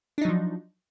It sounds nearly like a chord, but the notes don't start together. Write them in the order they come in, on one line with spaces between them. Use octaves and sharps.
D4 D#4 F#3 F3